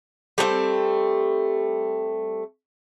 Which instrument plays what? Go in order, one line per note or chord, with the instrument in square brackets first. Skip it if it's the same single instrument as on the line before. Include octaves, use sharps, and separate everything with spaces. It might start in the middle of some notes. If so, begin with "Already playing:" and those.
[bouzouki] G3 A3 B3 C4